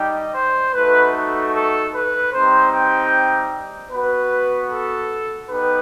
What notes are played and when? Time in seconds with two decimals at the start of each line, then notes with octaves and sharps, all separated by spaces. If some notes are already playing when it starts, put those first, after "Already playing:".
Already playing: G3 D#4 G4 D#5
0.34 C5
0.73 A3 D#4 F#4 B4
1.13 A4
1.52 A4
1.93 B4
2.32 G3 C4 D#4 G4 C5
2.72 G5
3.91 B3 F#4 B4
4.70 A4
5.50 B3 D#4 G4 B4